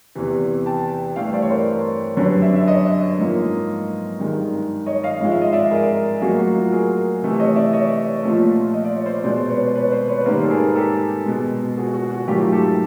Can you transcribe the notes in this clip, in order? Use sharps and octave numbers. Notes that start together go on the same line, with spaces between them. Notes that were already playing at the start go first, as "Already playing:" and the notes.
E2 C3 E3
G5 A5
G2 E3 A3 F5 G5
C5 D5
C#5
A#4 C5
F#2 D3 G3 B4 C#5
D5 E5
E5
C#5 D#5
G#2 F3 A#3
G2 D#3 G#3
C#5 D#5
D#5 F5
G#2 F3 G#3 F5
E5
D#5
D5 E5
G#4 A#4
A2 F#3 A#3 F#4 G#4
F#4
F4
G#4 A#4
C3 E3 A3
C#5 D#5
D5 E5
C#5 D#5
A#2 F3 A3
D#5
D5
C#5
C5 D5
B2 G#3 C5 D5
B4 C#5
B4 C#5
C5 D5
B4 C#5
B4
G#2 D#3 G3 A#3 A#4 C5
A4
G#4 A#4
G4 A4
B2 G#3
F#4 G#4
F#4
F#4
G#2 D#3 F#3 A3 F4 G4
G4 A4